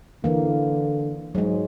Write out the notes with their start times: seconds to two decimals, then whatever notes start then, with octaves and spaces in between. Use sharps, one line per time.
0.24 D3 E3 A#3
1.35 G#2 F#3 G#3